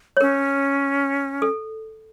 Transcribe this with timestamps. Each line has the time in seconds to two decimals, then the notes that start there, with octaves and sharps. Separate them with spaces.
0.17 C#5
0.21 C#4 A#4
1.42 A4